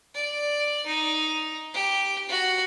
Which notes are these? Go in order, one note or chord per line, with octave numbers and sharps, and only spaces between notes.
D5
D#4
G4
F#4